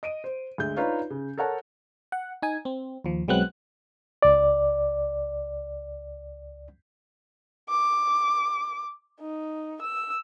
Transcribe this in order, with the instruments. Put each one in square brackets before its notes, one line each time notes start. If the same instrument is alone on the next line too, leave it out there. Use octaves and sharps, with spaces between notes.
[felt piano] D#5 D7 D#7
C5
D2 G#3 G6
D4 D#4 F4 B4 C#5 F5
C#3
A4 A#4 C#5 F#5 A5
[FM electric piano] F#5
D#4 G#5
C4
D#2 F3
B1 F#3 G#3 B3 C4 F#6
[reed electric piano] C#2 D5
[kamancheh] D6
D#4
E6